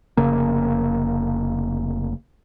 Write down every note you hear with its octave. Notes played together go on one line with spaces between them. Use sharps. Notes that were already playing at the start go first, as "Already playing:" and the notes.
F1 C#3 A#3